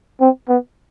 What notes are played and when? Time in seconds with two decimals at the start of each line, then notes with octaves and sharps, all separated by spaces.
0.21 C4
0.48 B3